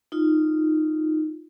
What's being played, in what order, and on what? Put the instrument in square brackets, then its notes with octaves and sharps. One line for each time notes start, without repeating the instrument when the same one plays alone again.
[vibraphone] D#4 F4